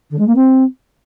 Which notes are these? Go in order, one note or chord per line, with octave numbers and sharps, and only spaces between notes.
D3
G#3
A#3
C4